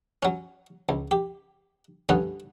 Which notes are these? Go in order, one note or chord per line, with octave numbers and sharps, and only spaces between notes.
F#3 C#4
C#2
G4
G2 D3 B3 C#4